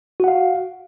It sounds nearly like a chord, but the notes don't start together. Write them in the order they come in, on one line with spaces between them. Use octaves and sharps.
F#4 F#5 F5